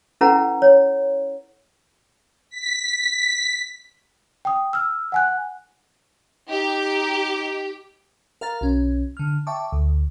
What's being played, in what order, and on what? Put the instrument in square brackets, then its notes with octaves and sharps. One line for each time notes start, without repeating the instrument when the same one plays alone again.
[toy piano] C#4 E4 A4 B4 F#5 A#5
C#5
[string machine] B6
[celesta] G5 D#6
E6 F6
F#5 G#5 F#6
[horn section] D#4 [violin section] G4
[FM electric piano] A#4 F5 A#5 A6
B1 C#4
D3 F6
E5 G5 A5 C#6 D6
D2